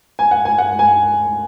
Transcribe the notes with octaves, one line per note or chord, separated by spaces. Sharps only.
G#5
F#5
G#5
F#5
G#5